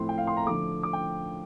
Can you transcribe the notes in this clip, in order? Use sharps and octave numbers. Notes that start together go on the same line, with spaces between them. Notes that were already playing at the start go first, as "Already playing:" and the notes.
Already playing: A2 F3 C4 E4 C6
G5
F5
C6
A#5
D3 F3 A3 D6
D6
G5